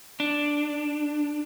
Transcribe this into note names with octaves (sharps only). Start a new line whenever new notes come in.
D4